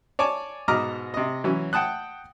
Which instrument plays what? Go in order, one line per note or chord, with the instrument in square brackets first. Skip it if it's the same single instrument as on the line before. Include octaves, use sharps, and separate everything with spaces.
[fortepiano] C#5 D5 G#5 A5 D6
G#2 B2 D#5 A#5 D6 F6
C3 D#5
E3 F#3 C#4
F#5 G5 A5 D#6 F#6